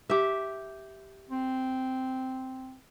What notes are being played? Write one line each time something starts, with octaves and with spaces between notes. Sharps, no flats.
G4 E5
C4